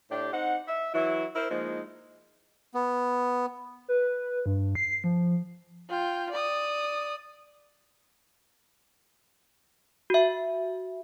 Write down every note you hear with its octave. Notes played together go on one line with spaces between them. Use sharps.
A2 D4 G4
C4 D#4 F#5
E5
E3 F#3 E4
E4 A#4 C5
F3 G#3 A#3 D#4
B3
B4
G2
C7
F3
F4 G5
D5 D#6
F#4 E5